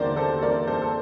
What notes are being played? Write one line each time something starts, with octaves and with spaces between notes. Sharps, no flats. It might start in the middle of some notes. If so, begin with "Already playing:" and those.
Already playing: D#2 D3 A#4 C5 D5
A4 C5
A#4 D5
A4 C5
A4